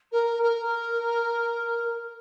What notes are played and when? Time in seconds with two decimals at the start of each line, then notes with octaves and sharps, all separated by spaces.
0.11 A#4
0.42 A#4